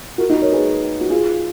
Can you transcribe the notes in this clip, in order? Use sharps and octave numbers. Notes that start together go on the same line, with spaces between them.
F#4 A#4
D#4 F#4
A#4 C#5
G#4 B4
F#4
F4 G#4